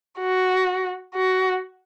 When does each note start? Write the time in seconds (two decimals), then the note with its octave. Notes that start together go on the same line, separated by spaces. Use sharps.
0.20 F#4
1.15 F#4